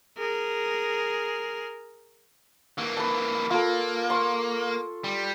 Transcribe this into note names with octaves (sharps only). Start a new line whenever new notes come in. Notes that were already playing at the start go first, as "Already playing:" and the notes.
G#4 A#4
E3 A#3
B4 A5
A#3 F4 A4
C6 C#6
G3